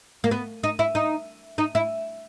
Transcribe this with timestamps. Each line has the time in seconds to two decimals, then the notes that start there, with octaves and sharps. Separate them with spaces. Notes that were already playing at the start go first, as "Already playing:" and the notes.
0.24 A#3
0.31 B3
0.63 D#4
0.79 E4
0.95 D#4
1.58 D#4
1.75 E4